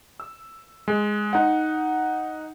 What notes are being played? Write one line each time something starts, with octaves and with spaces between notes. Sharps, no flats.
E6
G#3
D#4 F#5